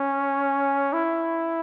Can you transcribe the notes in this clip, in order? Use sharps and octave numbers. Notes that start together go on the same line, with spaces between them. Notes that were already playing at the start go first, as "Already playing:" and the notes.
Already playing: C#4
E4